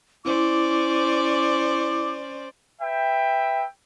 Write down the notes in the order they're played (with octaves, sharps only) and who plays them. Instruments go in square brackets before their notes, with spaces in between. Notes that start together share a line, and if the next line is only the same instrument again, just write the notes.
[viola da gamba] C#4 C5 D5 [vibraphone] E4 [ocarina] D6
[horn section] B4 E5 G5